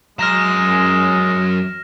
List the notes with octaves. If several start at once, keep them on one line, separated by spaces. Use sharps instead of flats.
F#2 G#3 A#5 F6 A#6 E7